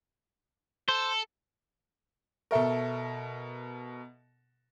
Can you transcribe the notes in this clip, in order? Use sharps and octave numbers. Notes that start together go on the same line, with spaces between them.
A4 C5
B2 A4 A#4 E5 C#6